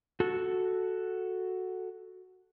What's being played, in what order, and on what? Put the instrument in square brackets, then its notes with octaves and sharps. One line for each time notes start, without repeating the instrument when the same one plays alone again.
[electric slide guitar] F#4 A4